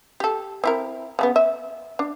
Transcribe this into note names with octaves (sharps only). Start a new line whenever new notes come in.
G4 A4
C4 E4 A#4
C#3 A3 B3
E5
D4